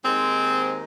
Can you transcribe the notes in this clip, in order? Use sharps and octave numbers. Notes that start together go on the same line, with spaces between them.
D#2 D#3 G#3 C4